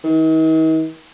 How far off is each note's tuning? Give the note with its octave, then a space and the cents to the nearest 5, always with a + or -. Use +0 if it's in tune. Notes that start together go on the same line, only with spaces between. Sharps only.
D#3 +45